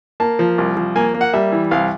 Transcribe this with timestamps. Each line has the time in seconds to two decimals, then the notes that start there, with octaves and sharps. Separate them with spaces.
0.20 A#3 A5
0.39 F3
0.58 C2
0.77 F3
0.96 A#3 G#5
1.14 A#3
1.21 F#5
1.33 G3 E5
1.52 E3
1.71 C2 F5